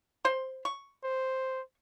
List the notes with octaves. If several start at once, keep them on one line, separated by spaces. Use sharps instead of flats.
C5 C6
C#6
C5